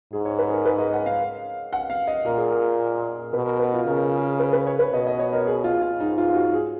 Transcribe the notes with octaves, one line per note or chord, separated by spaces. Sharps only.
G#2 G#4
C#5
B4
G#4
A#4
B4
D#5
F#5
F5
F#5
F5
D#5
A#2 A#4
G#4
A#4
B2 B4
A#4
B4
F4
C#3 A#4
G#4
B4
B4
C#5
B4
B2 D#5
D#5
C#5
A#4
G#4
F4
F4
G#2 D#4
F4
F4
F#4
G#4